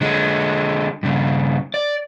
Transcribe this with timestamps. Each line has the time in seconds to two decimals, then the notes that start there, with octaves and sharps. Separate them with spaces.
0.01 D3 G#3
1.03 G2 C#3
1.74 D5